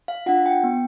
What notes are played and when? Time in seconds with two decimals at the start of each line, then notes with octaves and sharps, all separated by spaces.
0.08 F5
0.26 D4 F4 F#5
0.46 G5
0.64 B3